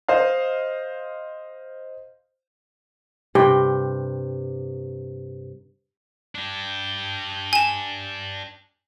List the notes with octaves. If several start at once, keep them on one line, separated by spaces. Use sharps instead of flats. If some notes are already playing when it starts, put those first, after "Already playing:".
C5 D#5 F5
G2 C3 G5
D4 G4
G#5 E7